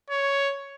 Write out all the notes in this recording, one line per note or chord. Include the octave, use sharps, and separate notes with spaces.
C#5